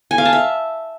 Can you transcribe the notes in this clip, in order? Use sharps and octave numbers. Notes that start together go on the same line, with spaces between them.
G#5
F5
A5
E5